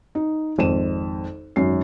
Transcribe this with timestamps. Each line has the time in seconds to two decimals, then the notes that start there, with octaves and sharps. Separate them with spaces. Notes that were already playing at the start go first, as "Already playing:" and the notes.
0.15 D#4
0.58 G#1 F2 D#7 E7
1.56 G#1 F#2 F#4 C7